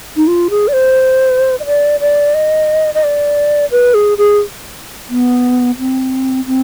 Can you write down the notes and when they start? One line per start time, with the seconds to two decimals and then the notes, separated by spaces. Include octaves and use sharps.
0.17 D#4
0.27 F4
0.50 G#4
0.68 D5
0.73 C5
1.60 D#5
1.66 D5
2.00 D5
2.34 D#5
2.94 D#5
3.04 D5
3.71 B4
3.94 G#4
4.18 G#4
5.09 B3
5.79 C4
6.46 C4